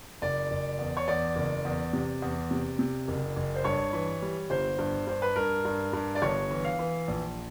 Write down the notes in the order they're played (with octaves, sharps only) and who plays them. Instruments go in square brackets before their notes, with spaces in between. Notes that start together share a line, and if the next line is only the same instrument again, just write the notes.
[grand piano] F#1 D5
F#1
E2
C#5
E2 D5
F#1
E2
C3
E2
C3
C3
F#1
F#1
C5
G2 C#5
E3
G3
G1 C5
G2
G2 C5
B4
G2 A#4
G2
G2
D5
G1 C#5
E3
F5
E3
A#1